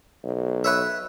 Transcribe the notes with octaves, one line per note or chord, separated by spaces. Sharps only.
B1
B4 C#5 E5